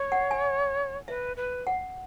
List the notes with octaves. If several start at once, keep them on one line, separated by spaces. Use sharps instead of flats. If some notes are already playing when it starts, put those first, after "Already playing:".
Already playing: C#5
F#5
G#5
B4 E5
B4
F#5